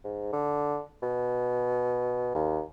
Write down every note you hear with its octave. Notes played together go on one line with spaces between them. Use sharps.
G#2
D3
B2
D#2